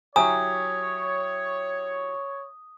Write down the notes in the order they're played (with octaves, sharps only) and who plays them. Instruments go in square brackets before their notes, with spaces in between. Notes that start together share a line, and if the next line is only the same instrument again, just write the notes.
[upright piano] F#3 E4 G4 [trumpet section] C#5 [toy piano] G#5 A#5 [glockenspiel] D#6